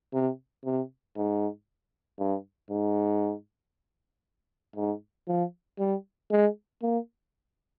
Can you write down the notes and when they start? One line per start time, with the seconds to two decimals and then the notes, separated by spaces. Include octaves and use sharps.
0.13 C3
0.65 C3
1.16 G#2
2.19 G2
2.71 G#2
4.76 G#2
5.28 F3
5.79 G3
6.31 G#3
6.82 A#3